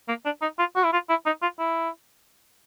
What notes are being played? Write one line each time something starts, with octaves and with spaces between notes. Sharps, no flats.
A#3
D4
D#4
F4
F#4
E4
F4
E4
D#4
F4
E4